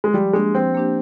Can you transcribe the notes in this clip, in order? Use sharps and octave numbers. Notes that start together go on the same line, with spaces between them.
G#3
F3 G3
G#3 A#3 D4 G4
F3 C4
A#3 D4 G4